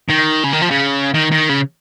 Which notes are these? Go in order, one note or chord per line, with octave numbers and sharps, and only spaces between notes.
D#3
C#3
D#3
F3
C#3
D#3
D#3
C#3